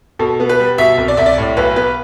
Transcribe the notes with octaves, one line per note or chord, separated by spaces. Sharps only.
B2 A4
B3
B4
G3
B2 E5
C2
D5
C2 E5
D5
A2
B1 B4
B3 B4